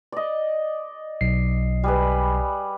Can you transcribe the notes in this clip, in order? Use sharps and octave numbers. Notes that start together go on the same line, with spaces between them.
D5 D#5
B1 C7
G3 G#4 B4